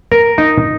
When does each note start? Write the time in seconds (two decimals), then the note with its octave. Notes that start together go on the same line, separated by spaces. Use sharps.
0.12 A#4
0.38 D#4